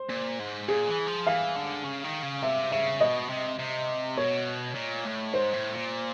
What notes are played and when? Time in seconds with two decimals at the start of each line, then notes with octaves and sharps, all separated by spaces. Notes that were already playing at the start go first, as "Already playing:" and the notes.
Already playing: C5
0.10 A#2
0.40 G#2
0.68 A#2 G#4
0.87 E3
1.07 F3
1.27 E3 F5
1.56 D3
1.85 C#3
2.04 D#3
2.23 C#3
2.42 C3 E5
2.72 C#3 E5
3.00 B2 D#5
3.30 C3
3.59 C3
4.17 B2 C#5
4.75 A#2
5.05 A2
5.33 G#2 C5
5.53 A2
5.72 A#2